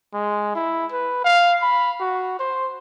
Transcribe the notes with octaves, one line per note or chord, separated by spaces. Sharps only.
G#3
E4
B4
F5
B5
F#4
C5